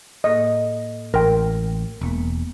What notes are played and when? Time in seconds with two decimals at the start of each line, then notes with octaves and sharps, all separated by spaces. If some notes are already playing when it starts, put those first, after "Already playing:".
0.24 A2 A#3 A4 D#5
1.14 A1 A#4 G5 C6
2.01 E1 G#3 A#3 B3